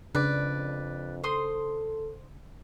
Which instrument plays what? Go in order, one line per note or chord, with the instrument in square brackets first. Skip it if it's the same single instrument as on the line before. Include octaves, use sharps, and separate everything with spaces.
[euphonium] F2 [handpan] C#3 D4 [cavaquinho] B4 D5
[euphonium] A4 [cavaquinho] C5 C6 D#6